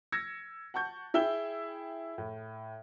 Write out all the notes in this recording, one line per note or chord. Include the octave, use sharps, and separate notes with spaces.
E6 G#6 A#6 C#7
F#5 A5 C#6 G6
E4 G#4 E5 G5 E6 G7
A2